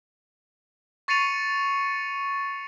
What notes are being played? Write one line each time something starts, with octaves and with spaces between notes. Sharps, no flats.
C#6 A6 C7 C#7 D#7 F7